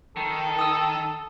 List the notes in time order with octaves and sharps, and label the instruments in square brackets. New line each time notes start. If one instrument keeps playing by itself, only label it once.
[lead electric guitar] D#3 [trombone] A4
[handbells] D#6 E6